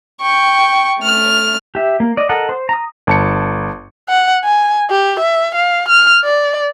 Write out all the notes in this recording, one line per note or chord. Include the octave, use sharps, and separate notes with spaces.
G5 C#6
A3 F6
G4 E5
A#3
D5 D#5
A4 A#4 D#5 F#5
C5
A#5 D#6
G1 A5 C#7
F#5
G#5
G4
E5
F5
F6
D5